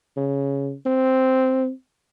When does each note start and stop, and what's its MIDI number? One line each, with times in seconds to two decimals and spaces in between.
0.17 0.73 49
0.86 1.70 60